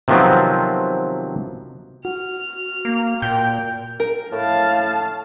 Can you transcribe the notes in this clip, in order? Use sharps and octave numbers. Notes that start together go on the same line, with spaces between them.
C3 D#3 F3 F#3 B3 C4
F#4 F6
A#3
A#2 A#4 G5 G6
A#4
A2 F5 A5